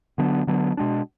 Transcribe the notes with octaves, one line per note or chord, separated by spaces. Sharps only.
D3 F#3 B3 D4
D3 F#3 B3 D4
B2 G#3 D4